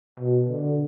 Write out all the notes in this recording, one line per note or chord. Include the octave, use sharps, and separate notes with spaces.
B2
D3